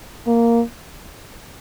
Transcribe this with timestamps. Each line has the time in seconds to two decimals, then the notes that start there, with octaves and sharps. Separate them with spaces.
0.27 A#3